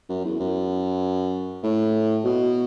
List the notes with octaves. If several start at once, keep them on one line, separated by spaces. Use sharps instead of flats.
F#2
E2
F#2
A2
B2